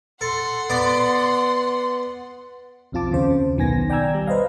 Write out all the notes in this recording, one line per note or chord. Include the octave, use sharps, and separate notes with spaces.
A4 F#5 C6
B3 D5
B1 F2 C4 F4 A5 D6
D#2 C#3 C5
B1 D#3 B3 G#5 A#6
D5 G5 G#5 A#5 E6 G#6
G3
B4 C5 D#5 F5